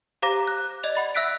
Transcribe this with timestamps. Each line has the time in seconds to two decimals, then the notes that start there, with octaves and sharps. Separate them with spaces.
0.22 G4 C5 F5 A#5 D6 A#6
0.47 F#6
0.83 D5 D#5 F7
0.95 F#5 B5 A6
1.15 E5 E6 F#6 B6 D7